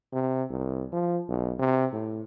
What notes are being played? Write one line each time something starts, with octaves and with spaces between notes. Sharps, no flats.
C3
C2
F3
B1
C3
A2